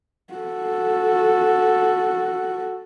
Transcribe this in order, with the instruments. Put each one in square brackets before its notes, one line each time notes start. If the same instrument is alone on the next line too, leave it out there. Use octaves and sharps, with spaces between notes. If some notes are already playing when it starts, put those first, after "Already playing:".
[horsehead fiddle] F#4 A4